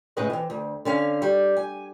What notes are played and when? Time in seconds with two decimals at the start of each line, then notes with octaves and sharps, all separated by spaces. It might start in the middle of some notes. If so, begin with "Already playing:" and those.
0.17 A2 C#3 G#3 G#4 B4 D#5
0.30 E3 C4
0.50 D2
0.85 D3 C#4 F5
1.22 G3
1.57 G#5